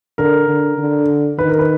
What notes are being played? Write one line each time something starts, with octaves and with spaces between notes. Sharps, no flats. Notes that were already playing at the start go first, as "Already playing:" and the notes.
D3 A#4
D3
D3
D#3 B4
A#4
B4